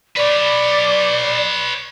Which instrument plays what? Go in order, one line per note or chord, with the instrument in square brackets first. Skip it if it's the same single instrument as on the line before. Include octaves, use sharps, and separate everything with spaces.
[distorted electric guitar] B4 C#5 [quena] D5